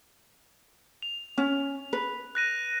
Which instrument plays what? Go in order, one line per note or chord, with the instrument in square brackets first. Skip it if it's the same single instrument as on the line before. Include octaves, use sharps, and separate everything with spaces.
[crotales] F7
[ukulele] C#4
B4
[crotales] F#6 A#6 D#7